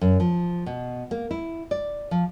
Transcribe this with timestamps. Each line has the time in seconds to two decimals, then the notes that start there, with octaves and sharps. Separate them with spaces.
0.01 F#2
0.20 F3
0.66 B2
1.11 A#3
1.31 E4
1.71 D5
2.11 F3